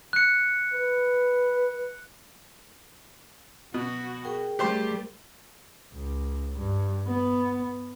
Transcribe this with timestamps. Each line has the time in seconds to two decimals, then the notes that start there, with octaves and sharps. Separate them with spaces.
0.13 F#6 C#7
0.74 B4
3.74 B2 F#4
4.24 G#4 A#4 G5
4.59 G3 A3 G4 C5 C6
5.94 C#2
6.58 G2
7.08 B3